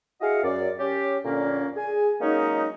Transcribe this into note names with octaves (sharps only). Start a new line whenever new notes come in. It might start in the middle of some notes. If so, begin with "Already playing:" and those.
E4 F#4 G#4 D#5 F5 F#5
F#2 D5
C#4 G4
F2 A#2 D3 A#3 C#4
G#4 G#5
F#3 G#3 A#3 C#4 D#4